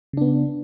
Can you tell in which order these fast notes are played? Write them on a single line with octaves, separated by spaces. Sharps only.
C#3 D4 B3